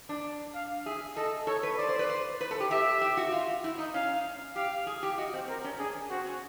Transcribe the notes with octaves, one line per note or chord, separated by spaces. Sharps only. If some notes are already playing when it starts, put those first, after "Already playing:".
D4
F5
G#4 E5
A4 D#5
A4 C#5
B4
C5 D5
C5
B4
C5
B4
A4
G4
G4 E5
G4
F#4
F4
E4
D#4
C#4 F5
G4 F5
G#4
G4
F#4 D#5
C4
C4 A#4
C#4
D4 G#4
C4 F#4
C#4